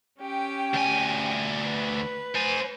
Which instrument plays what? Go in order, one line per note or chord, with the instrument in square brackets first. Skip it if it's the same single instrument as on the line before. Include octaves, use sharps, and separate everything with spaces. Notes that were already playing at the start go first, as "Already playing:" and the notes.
[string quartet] C#4 G4 G5
[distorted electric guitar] D2 G#5
[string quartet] B4
[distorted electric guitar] C5 G#5